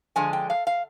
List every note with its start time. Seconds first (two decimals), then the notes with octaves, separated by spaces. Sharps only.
0.16 D3 F3 G#3 G#5
0.33 G5
0.50 F5
0.67 F5